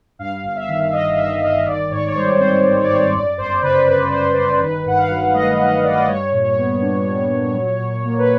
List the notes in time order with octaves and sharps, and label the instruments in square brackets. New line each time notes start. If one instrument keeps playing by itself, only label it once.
[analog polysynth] G2 F5
G1
E5
D#3
G1 D#5
G2 E5
G1 D#5
D#3 D5
G#2 C#5
C#5
G3 C5
C4 C5
D#3
C#5
D5
G#2 C#5
F#2 D5
G1 C5
C#3 B4
G1 B4
F#2 C5
G1 C5
C5
D#3 B4
G2 F#5
F5
F#3
A3 D#5
D#3 D#5
G2 D5
D#5
D5
G3 C#5
A#2
C#5
B3
D4
G3
A#2
F#3
A#2
A#3
B4